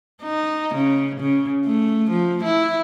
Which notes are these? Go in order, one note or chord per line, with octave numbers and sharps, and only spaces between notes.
D#4
C#3
C#3
A3
F3
E4